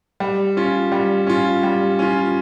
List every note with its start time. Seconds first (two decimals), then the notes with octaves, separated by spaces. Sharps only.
0.20 G3
0.57 C#4 F4
0.92 G3
1.27 C#4 F4
1.63 G3
1.99 C#4 F4